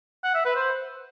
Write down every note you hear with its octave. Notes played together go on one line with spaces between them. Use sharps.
F#5
E5
B4
C5